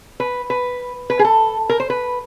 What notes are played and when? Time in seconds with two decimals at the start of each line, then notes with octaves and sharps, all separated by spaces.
0.20 B4
0.50 B4
1.10 B4
1.19 G#4
1.25 A4
1.69 A#4
1.80 C5
1.90 B4